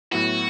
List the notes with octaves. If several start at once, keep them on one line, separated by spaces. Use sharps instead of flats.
A2 F#3 B3 E4 F#4